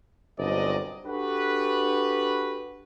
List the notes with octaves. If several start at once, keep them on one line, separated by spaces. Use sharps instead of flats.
G1 C2 F#3 C4 D5 D#5
D4 F#4 G4 A4 B4